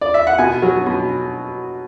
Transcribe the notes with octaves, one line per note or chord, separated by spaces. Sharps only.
D5
E5
F#5
B2 G#5
F#3
B2